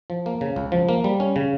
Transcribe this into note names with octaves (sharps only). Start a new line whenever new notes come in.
F3
A#3
C#3
C#2
F3
A#3
G3
C#4
C#3